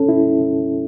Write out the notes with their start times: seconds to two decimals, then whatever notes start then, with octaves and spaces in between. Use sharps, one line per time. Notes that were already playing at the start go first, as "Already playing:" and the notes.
Already playing: C#4 A4
0.09 E4